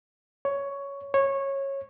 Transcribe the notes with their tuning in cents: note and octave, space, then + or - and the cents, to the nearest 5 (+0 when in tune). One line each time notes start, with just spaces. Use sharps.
C#5 +10
C#5 -15